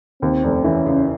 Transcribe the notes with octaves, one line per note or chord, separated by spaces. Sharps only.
D#2 C4
F1
E3 C#4
C#3